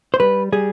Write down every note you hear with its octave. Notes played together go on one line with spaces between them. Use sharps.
C5
G3 B4
G3 G#4